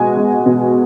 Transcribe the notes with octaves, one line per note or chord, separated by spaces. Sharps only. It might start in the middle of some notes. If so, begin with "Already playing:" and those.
Already playing: B2 G#3 F#4 G#5
G#3
B2